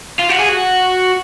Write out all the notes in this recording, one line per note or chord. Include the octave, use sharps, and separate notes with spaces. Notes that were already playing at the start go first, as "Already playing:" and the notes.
F4
F#4
G#4
F#4